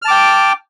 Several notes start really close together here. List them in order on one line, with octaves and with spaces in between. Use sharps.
F6 A5 D6 G5